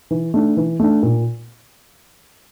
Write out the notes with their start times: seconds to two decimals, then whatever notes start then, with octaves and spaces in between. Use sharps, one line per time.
0.11 E3
0.34 A3 D4
0.57 E3
0.80 A3 D4
1.03 A#2